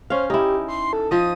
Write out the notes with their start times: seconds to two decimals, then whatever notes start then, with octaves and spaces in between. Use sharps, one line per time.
0.10 C#4 C5 F5
0.30 D#4 E4 G4
0.68 C6
0.93 A4
1.11 F3 D#5 D#6